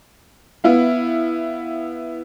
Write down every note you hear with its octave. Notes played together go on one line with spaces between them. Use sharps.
B3 E4 F5